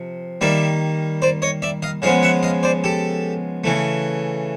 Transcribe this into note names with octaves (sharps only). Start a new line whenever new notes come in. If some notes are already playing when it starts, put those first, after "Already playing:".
Already playing: C3 F3
D#3 G3 A#3 D5 E5
C5 D5
C#5 D#5
D5 E5
D#5 F5
C#3 F3 G#3 B3 D#5 F5
E5 F#5
D#5 F5
C5 D5
G4 A4
C#3 E3 A3